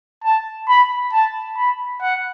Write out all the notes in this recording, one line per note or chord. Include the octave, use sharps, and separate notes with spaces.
A5
B5
A5
B5
F#5